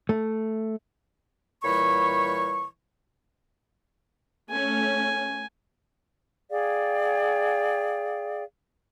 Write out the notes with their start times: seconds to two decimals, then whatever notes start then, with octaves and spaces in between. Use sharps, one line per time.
0.09 A3
1.63 A#2 E3 G3 C#5 B5 C#6
4.50 A3 C#4 G#5
6.50 G#4 D5 F5 G5